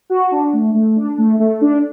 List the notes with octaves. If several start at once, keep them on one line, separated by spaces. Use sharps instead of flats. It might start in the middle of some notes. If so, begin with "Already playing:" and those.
F#4
D4
A3
A3
D4
A3
A3
D4